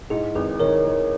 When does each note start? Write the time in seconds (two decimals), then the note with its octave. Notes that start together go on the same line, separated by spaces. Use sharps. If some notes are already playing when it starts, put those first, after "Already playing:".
0.10 G#2 E4 G#4
0.35 G#1 G#4 B4
0.60 D#3 A#4 C#5
0.85 D#3